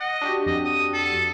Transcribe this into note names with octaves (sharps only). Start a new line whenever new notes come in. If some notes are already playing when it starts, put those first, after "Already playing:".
D#5 F#5
D4 F#4 G4
F2 D#5
D#6
A4